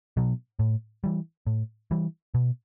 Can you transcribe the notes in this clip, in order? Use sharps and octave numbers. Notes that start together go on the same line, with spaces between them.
B2 F#3
A2
E3 G3
A2
E3 G3
B2